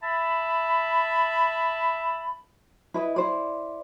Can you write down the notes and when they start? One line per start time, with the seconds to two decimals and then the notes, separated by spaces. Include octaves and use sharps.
0.03 E5 A5 B5
2.94 E4 B4 D#5
3.16 E4 C5 D5